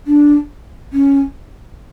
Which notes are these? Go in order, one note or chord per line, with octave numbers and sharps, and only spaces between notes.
D4
C#4